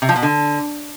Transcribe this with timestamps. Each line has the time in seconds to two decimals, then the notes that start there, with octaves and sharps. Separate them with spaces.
0.02 C3
0.09 F3
0.16 B2
0.23 D3